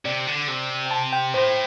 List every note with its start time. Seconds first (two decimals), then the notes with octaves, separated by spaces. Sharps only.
0.05 C3 D5
0.27 D3
0.48 C3
0.86 G5
0.91 A5
1.13 G5
1.34 A2 C5